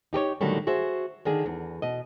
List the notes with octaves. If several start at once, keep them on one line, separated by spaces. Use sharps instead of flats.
D#4 G4 A4 C#5
A#2 D3 D#3 F#3 G3 A3
F#4 G#4 C5 E5
D3 D#3 D4 G#4
E2
B2 D#5